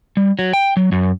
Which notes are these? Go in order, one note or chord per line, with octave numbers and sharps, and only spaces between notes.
G3
F#3
G5
F#3
F#2